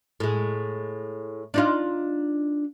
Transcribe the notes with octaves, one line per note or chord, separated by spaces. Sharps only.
A2 G#3
D4 D#4 F4